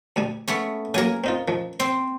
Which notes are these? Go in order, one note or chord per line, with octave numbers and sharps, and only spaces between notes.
D2 G3 G#5
A3 B3 C#4
C#3 F#3 A#3 A#4 G#5
C4 D#4 F4
D#3 F3
C4 C5